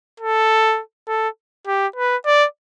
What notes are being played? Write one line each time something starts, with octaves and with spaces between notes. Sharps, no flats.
A4
A4
G4
B4
D5